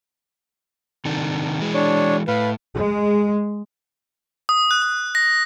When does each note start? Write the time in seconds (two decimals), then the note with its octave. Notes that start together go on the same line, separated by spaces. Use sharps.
1.05 C3 D#3 D4
1.60 E3 G#3
1.74 D4 C#5
2.28 A2 B4 F5
2.75 G#3
4.49 D#6
4.71 F#6
4.82 D#6
5.15 A#6